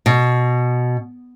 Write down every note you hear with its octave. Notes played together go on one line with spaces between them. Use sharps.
B2